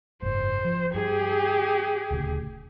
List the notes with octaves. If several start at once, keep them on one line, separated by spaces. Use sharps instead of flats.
F#1 G#2 C5
F3
G2 G4 G#4
D#1 D2 C#3